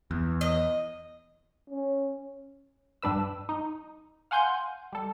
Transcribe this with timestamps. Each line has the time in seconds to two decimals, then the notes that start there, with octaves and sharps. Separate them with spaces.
0.11 E2
0.41 D#5
1.70 C#4
3.02 G2 G3 D4 B4 E6
3.49 D#4
4.31 F5 F#5 G#5 C6 G6
4.92 G3 A4